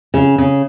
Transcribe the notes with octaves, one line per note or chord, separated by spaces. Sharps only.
C#3
C#3